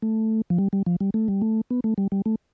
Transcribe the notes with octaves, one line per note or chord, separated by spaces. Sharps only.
A3
F3
G3
G3
F3
G3
A3
G3
A3
B3
A3
G3
G3
A3